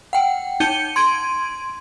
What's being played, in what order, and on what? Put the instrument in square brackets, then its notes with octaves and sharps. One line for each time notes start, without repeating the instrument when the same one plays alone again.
[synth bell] F#5 G5
D#4 G6 C#7 D#7 G7
C6 G#6 D7 D#7